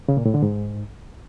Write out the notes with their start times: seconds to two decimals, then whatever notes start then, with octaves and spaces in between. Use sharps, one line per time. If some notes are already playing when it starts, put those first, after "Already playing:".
0.09 C#3
0.17 A#2
0.26 A2
0.34 D3
0.43 G#2